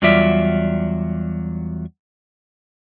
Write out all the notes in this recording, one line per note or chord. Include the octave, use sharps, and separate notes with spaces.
E2 F#3 G3 F4 D5 E5